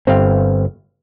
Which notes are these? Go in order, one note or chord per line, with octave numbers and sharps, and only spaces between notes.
G1 C4 F5